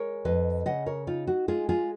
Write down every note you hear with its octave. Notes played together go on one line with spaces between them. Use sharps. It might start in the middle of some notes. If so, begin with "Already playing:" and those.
Already playing: G#3 A#4 C#5
F2 B4 D#5
C#3 D#5 F#5
A#4 C#5
D#4 F4
F#4
G#3 F4 G#4
F4 G#4